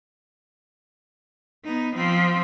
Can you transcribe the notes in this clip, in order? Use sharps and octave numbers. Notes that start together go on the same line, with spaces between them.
B3 D#4
F3 C4